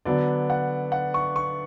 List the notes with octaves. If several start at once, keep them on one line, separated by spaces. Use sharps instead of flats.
D3 F#3 B3 D4 D5
F#5
F#5
C#6
C#6